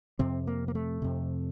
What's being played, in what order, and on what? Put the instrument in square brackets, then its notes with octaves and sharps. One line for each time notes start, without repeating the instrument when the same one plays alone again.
[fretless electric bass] F2 C3 C4
A#3
A#3
A3
F2 C3